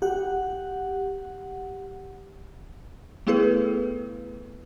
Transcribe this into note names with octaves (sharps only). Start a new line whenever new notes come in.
G4 F#5
A3 B3 E4 G#4 A4 B4